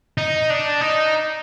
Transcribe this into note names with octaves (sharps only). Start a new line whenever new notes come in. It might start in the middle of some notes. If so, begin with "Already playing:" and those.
D#4
D4
D#4